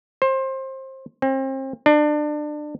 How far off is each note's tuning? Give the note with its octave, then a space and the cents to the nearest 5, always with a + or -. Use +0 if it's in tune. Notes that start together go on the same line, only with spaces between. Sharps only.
C5 +25
C4 +35
D4 +25